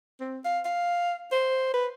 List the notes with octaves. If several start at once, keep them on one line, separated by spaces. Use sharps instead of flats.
C4
F5
F5
C5
B4